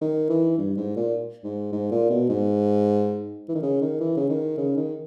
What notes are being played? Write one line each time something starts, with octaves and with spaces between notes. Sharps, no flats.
D#3
E3
G2
G#2
A#2
G#2
G#2
A#2
B2
G#2
E3
D#3
C#3
D#3
E3
C#3
D#3
C#3
D#3